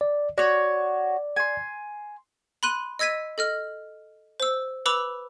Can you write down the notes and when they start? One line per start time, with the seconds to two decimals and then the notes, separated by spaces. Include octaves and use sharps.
0.01 D5
0.38 F#4 C#5 D5
1.36 G#5 C6
2.63 B5 C6 F#6 D#7
2.99 D#5 E6 G#6 B6 D#7
3.38 A4 D#5 F6
4.40 C5 E6
4.86 B4 B5 D6 E6 F7